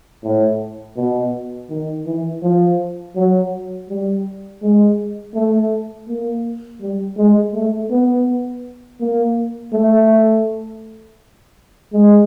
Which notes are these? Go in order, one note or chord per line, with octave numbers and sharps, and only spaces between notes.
A2
B2
D#3
E3
F3
F#3
G3
G#3
A3
A#3
G3
G#3
A3
B3
A#3
A3
G#3